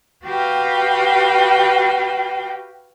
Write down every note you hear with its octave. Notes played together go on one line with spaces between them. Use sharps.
F#4 G4 B4 F5 G5